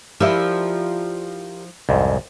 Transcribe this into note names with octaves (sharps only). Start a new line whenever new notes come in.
F3 E4 G4 A#4 D5
C2 F2 G#2